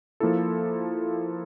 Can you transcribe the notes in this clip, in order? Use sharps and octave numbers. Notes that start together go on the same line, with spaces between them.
F3 A#3 E4 A4